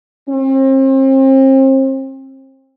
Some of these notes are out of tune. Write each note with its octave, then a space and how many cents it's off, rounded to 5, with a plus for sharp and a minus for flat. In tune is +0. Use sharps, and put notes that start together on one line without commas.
C4 +35